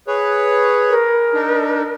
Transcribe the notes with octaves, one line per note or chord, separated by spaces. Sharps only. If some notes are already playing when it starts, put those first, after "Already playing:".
G#4 B4 C#5
A#4
D4 D#4